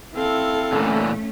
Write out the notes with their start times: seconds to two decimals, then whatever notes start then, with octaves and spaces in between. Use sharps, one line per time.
0.15 C4 E4 A4 F5
0.72 A#2 D3 E3 A3 C#4